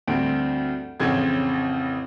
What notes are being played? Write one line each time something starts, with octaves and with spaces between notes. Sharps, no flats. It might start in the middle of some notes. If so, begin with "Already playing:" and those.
D2 G2 C4 D7
A1 F2 C#3 C4 G#6